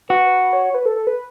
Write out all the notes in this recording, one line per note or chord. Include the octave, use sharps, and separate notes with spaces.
F#4 B4
B4
B4
C#5
C#5
B4
A4
A4
B4